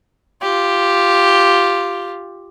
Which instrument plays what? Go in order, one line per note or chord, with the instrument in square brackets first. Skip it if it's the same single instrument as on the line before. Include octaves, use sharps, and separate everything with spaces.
[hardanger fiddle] F4 G4